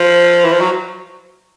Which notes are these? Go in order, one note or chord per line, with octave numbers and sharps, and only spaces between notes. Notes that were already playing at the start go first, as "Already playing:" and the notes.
Already playing: F3
E3
F3
F#3